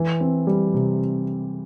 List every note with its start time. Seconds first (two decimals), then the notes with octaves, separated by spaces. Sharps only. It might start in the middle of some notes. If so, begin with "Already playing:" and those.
Already playing: E3
0.21 C4
0.47 G3
0.74 C3